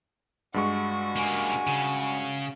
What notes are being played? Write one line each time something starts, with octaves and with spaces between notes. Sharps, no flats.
G2 G#3 F#4 C#6
C#3 A#3 G#5
C#3